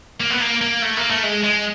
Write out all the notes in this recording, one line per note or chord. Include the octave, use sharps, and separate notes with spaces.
A#3
B3
A#3
A#3
A3
A#3
A3
G#3
G#3